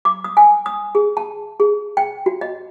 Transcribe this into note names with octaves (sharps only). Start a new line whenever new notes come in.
D6
D#6
G#5
D#6
G#4
A5
G#4
G5
F#4
D#5